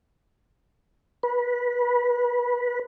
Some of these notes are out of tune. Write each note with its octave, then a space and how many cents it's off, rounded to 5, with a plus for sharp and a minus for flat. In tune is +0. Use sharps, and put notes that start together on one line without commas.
B4 -25